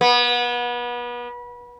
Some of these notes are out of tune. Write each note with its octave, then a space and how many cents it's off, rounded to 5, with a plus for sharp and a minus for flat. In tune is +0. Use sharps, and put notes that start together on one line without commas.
B3 -30